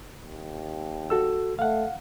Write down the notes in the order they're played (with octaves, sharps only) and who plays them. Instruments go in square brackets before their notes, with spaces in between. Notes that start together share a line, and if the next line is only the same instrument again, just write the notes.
[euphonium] D#2
[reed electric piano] F#4 A4 E6
[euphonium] A3 [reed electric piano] F5 F#5